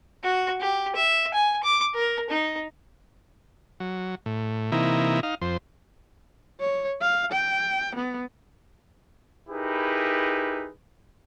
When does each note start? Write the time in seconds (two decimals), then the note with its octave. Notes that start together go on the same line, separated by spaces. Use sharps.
0.23 F#4
0.60 G4
0.95 E5
1.34 G#5
1.63 D6
1.95 A#4
2.30 D#4
3.80 F#3
4.26 A2
4.72 C3 E3 A#3 D#4 E4
5.23 D#4 F5
5.41 F2 C5
6.61 C#5
7.01 F5
7.32 G5
7.96 B3
9.50 D#4 E4 G4 G#4 A#4 B4